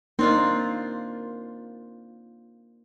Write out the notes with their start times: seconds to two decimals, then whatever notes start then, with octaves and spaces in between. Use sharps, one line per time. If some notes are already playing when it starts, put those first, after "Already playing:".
0.19 A#3 C4 D4 D#4 F4